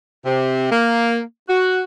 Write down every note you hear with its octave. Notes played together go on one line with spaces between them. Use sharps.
C3
A#3
F#4